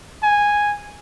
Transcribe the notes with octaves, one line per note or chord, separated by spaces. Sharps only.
G#5